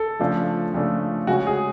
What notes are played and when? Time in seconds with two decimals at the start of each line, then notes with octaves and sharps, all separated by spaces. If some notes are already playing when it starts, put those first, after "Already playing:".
Already playing: A4
0.19 C#3 F3 A3 D4
0.74 C#3 F3 A3 D4
1.27 C#3 G#3 C#4 F#4
1.47 G#4